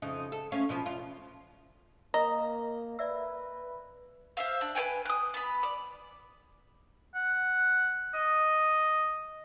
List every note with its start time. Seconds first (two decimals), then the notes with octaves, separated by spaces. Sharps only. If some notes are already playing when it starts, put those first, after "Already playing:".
0.02 F2 C#3 D#4
0.32 A4
0.52 A3 C#4 F5
0.69 B2 F3 B3
0.86 E2 F4
2.14 A#3 A#4 D#5 A#5
2.99 B4 D5 E5 E6
4.37 C5 E5 F5
4.61 D4
4.75 B4 C#5 G5 G#5
5.06 D#6 F#6
5.34 B3 B5
5.63 D5
7.15 F#5
8.14 D#5